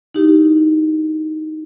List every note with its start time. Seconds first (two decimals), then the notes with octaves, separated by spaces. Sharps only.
0.15 D#4 E4 G4